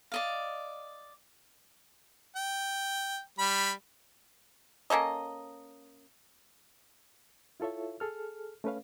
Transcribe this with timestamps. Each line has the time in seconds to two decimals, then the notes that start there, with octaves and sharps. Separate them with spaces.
0.12 D5 D#5 F5
2.36 G5
3.39 G3 B5
4.90 A#3 C#4 A4 D#5
7.60 E4 F4 A4 C#5 E5
8.00 G#4 A4 F6
8.64 A3 C#4 A4 B4 C#5 F5